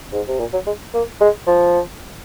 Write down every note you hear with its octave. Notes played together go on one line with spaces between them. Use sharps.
G#2
C3
A#2
F#3
G#3
A#3
G#3
F3